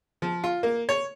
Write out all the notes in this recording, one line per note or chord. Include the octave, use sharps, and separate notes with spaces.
F3
F4
A#3
C#5